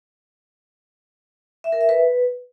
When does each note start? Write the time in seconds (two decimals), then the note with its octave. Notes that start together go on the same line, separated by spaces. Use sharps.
1.64 E5
1.72 A#4
1.81 E5
1.89 B4